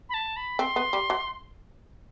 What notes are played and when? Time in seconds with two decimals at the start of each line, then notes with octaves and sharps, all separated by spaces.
0.09 B5
0.14 A5
0.36 B5
0.59 C4 C6
0.76 B3
0.93 G3
1.10 F#3